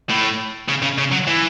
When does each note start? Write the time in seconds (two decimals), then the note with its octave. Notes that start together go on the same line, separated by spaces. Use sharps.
0.10 A2
0.69 C#3
0.83 C#3
0.98 C#3
1.12 F#3
1.27 E3